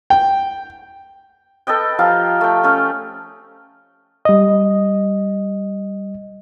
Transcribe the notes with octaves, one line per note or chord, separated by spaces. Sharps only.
G5
A4 B4 D#5 G5
F3 G4 F5 A#5
A3 G5
A3 C#4
G3 D#5